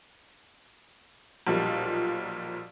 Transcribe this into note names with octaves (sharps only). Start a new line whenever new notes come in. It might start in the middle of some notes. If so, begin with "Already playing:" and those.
B1 A#2 F3 G3